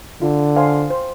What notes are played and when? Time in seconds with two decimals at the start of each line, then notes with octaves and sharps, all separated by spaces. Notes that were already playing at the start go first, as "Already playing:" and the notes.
0.22 D3 F4
0.56 C5 F5 G#5 C6
0.90 C5